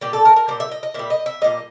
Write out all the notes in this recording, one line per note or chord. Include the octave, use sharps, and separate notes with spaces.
A#2 G3 G4
A4
A#4
A#4
A#2 G3 C5
E5
D#5
D#5
A#2 G3 E5
D#5
E5
A#2 G3 D#5